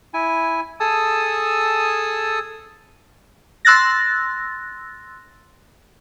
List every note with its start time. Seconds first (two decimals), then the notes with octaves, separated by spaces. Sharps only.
0.14 E4 G#5
0.80 G#4 A4 G#5 A5 D#6 E6
3.65 C6 E6 F#6 A6 A#6